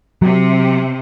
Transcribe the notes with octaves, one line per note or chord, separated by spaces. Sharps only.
C3 F#3